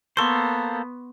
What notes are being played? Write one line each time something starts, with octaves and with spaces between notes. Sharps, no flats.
A#3 B3 A4 C5 C6 C#6